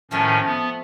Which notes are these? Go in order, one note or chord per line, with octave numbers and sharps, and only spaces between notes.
A2 D#3 F3 A3 C4 C#4
B3